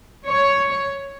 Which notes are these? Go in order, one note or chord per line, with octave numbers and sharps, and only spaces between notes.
C#5